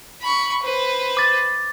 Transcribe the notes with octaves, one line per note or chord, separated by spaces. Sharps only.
B5 C#6
B4 C5
D6 A6